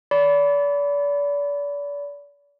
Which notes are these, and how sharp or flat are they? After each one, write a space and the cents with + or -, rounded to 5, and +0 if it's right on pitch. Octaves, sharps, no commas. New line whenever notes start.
D5 -35 B5 +5